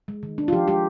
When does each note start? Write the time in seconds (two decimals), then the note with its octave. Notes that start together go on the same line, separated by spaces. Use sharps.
0.08 G#3
0.23 D#3
0.38 D4
0.48 F4
0.53 F3 G4
0.67 G#3 G4